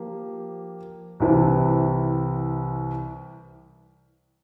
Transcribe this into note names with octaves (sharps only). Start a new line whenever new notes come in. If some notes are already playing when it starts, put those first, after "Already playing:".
Already playing: F3 A#3 G4
C2 C3 E3